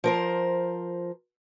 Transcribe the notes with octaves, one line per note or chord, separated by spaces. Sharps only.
F3 A#4 C5